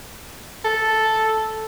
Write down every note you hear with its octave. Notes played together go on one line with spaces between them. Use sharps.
A4